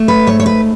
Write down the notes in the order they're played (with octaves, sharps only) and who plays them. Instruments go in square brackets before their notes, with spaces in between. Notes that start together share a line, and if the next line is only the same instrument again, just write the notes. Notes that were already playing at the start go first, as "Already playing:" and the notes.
Already playing: [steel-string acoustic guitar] A3
B4
G#2 C#5
C#5
B4